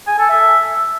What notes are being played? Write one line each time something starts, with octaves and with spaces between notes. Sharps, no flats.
G#5
A4
E5